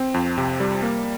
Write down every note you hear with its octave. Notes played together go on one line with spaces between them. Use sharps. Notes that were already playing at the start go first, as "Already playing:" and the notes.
Already playing: C4
F2
C3
G3
A#3